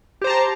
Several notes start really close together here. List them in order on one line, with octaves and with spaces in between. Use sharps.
G4 C5 A#5 A5